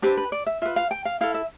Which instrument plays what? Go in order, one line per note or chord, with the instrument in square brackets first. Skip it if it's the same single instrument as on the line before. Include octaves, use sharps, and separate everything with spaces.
[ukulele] D4 G4 B4 C5
B4
D5
E5
F4 B4 E5
F5
G5
F5
E4 A4 F5
E5